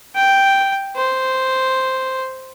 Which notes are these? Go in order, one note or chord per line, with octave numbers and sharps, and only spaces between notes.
G5
C5